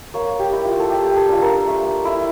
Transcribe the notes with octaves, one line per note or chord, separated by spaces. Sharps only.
A#3 C#5
G4
E4
F4
A4
A3 G4
A4
D4 F4
A#4
A3
E4